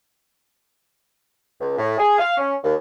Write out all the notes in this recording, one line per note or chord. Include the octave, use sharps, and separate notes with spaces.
C#2
A2
G#4
F5
C#4
D#2